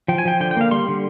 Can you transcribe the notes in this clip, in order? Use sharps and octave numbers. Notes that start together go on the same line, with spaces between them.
F3 G5
G#5
F3 G5
D3 G5
G5
A#3 F5
G3 C6
D3